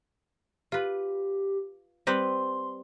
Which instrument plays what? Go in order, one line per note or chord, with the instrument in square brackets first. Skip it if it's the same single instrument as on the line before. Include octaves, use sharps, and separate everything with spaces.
[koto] F4 B4 [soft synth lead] G4
[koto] G3 C4 B4 [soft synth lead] C6